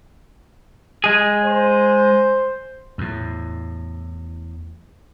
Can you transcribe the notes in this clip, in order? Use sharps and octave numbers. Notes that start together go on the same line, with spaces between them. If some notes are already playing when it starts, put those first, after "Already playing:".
G#3 G#4
C5
E2 A2